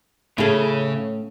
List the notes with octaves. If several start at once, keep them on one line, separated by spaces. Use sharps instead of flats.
A2 C#3 C#4 E4 G#4 A4